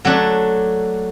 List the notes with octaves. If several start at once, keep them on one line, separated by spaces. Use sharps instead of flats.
F#3 A3 D4